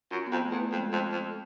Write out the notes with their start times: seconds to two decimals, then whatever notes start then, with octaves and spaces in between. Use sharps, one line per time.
0.11 F#2 F4
0.26 F2 B3
0.42 A3
0.51 E2
0.56 A3
0.72 F2 G#3
0.92 F2
1.12 F2